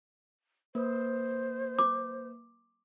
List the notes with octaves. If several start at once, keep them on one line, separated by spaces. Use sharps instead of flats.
A#3 B4 C5 D#6
D6